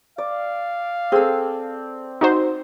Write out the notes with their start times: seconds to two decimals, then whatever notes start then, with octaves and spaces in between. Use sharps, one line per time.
0.18 D5 F5
1.12 C4 G#4 A4
2.21 D#4 F#4 C5